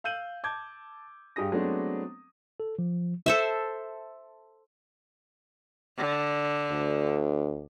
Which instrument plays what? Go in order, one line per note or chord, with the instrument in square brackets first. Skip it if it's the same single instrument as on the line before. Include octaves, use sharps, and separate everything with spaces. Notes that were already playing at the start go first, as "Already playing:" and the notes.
[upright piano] F5 E6 G6 D#7 F#7
A5 D6 G6 G#6
G2 G4 G#4 D#6 A#6
F#3 G#3 A3 B3 C4 D4
[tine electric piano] A4
F3
[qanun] A4 C5 E5
[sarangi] D3
[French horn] D2